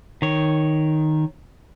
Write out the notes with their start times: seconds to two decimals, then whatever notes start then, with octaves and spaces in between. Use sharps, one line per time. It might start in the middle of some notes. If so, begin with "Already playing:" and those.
0.22 D#3 C#5